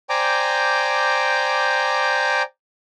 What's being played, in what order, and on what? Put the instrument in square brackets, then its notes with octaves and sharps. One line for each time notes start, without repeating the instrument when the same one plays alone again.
[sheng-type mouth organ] C5 D5 G5 G#5 A#5 D6